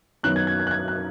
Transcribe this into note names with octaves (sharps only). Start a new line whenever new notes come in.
F#2 D#3 F#3 B3 F#6
G#6
G#6
G#6
F#6
G#6
F#6